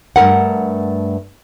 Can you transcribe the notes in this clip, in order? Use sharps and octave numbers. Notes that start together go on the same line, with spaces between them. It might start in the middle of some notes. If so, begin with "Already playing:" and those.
G2 A3 A#4 F#5